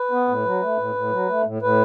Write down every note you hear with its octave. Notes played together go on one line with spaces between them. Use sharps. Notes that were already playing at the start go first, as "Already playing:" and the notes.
Already playing: B4
B3
A2
F#3
A3
A2
A2
F#3
A3
A2
A2 B4